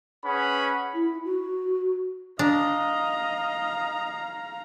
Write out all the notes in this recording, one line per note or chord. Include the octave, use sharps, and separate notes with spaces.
C#4 G#4 B4 F#5 B5
E4
F#4
D4 D#5 F5 A#5